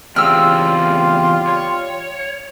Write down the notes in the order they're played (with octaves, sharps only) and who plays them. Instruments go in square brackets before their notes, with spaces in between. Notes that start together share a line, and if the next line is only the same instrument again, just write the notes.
[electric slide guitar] E2 C#3 C4 [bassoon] G3 [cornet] F4 [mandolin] E6 F6
[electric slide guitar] C#5